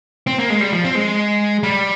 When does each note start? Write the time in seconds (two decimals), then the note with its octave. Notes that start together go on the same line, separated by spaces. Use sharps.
0.27 C4
0.39 A#3
0.50 G#3
0.61 G3
0.73 F3
0.84 C4
0.95 G#3
1.63 G3